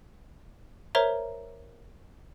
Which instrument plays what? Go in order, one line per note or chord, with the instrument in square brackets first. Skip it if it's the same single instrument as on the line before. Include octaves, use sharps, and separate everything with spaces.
[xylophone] A#4 C5 C#5 E5 A#5